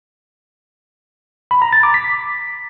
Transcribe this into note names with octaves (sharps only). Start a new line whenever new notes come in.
B5
A#5
A6
D6
B6